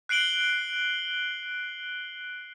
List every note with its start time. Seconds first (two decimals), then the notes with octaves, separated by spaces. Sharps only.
0.09 F#6 C7 D7 F#7 G7